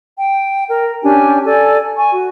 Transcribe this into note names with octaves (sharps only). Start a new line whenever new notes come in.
G5
A#4
C#4 D4 G4 G#5
A4 D5 G#5
G#5 C#6
F#4